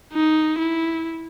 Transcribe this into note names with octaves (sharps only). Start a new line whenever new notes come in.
D#4
E4